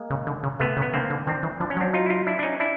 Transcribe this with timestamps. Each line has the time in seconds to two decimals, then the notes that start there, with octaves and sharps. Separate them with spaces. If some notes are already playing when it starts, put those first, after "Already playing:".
Already playing: G#3 A#3
0.10 C#3
0.27 D3
0.44 C#3
0.60 C3 A3 B3
0.77 C#3
0.82 B3
0.94 D3 A#3 C4
1.10 D3
1.27 D#3 C4 D4
1.43 E3
1.60 F3 D4
1.70 C#4
1.77 F#3 C4 D4
1.93 D#4 F4
2.06 E4
2.10 D#4 F4
2.27 D4 E4
2.39 D4
2.43 C#4 D#4
2.60 D4 E4